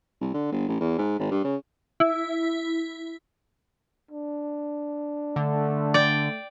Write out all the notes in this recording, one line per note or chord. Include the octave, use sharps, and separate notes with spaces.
C2
D3
G1
A1
E2
G#2
G#1
G2
C#3
E4
D4
D3 A3
D5 G5